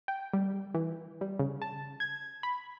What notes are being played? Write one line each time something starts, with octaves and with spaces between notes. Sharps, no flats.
G5
G3
E3
G3
C#3
A5
G#6
B5